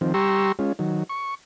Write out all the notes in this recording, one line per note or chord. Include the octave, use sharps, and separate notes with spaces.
D#3 F3 C4
G3 G4 A#5 C6 C#6 E6
G#3 C#4 F4
D#3 F#3
C#6